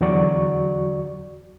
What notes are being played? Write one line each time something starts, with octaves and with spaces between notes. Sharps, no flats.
E2 D3 F#3 F#4 D5 C#6